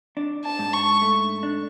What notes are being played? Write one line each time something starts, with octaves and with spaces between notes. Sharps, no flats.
D4
A5
G#2
C#6
A3
D4